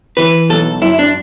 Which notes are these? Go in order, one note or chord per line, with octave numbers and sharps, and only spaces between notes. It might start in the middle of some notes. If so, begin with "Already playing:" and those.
E3 B4
B1 A4
F#2 E4
D4